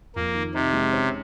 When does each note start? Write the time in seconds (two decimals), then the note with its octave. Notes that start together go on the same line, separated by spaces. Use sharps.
0.16 F2 A#3
0.35 D#3
0.54 C3 D#4
0.73 G#3
0.93 C#4